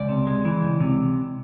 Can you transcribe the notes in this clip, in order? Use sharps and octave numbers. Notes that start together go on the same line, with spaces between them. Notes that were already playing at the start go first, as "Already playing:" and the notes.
Already playing: C#2 D5
C3
G#3
E3
C#2
C3